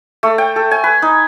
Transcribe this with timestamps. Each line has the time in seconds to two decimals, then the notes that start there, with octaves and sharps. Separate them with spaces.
0.23 A3
0.38 G5
0.56 A4
0.71 G#5
0.84 B4
1.02 D#4